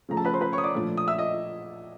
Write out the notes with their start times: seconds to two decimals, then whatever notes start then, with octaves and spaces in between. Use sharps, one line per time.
0.09 C#3 F3 A3 A#5
0.17 A4 A5
0.25 B4 B5
0.34 C5 C6
0.41 B4 B5
0.52 C#5 C#6
0.58 D#6
0.64 D5 D6
0.75 A#2 F3 A3 D4
0.98 D#6
1.07 E5 E6
1.18 D#5 D#6